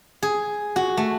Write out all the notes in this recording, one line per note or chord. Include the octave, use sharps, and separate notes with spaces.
G#4
F#4
A3